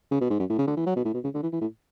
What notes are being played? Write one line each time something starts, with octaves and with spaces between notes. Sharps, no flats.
C#3
B2
G#2
F#2
A2
C#3
D3
E3
F#3
B2
A2
B2
C#3
D3
E3
E3
A2